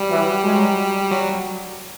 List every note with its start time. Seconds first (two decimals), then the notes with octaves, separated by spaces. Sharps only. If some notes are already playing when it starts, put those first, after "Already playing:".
Already playing: G3
0.09 E3 F#3
0.43 F#3 G#3
1.11 F#3